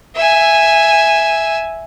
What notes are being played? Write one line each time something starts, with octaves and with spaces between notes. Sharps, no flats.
E5 G#5